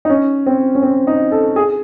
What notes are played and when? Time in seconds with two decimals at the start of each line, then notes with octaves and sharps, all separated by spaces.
0.05 D#4
0.10 C#4
0.46 C4
0.75 C#4
0.83 C4
1.07 D#4
1.32 A4
1.56 G#4